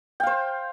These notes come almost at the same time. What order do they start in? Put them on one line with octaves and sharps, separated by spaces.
G5 F5 C5